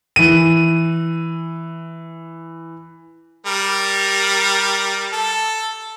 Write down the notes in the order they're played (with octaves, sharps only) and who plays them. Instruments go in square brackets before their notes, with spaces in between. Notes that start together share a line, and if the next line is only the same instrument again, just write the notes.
[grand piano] E3 D#7
[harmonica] G3 A#4
A4